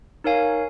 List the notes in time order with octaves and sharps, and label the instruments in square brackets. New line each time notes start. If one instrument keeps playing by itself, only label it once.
[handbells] D#4 A#4 C#5 F5 G#5